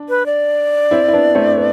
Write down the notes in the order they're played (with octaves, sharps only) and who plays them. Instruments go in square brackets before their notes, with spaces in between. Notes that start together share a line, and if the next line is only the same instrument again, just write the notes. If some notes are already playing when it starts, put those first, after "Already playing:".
Already playing: [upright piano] D4
[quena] B4
D5
[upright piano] C4 E4
E4
B3 D4
A3 C4
B3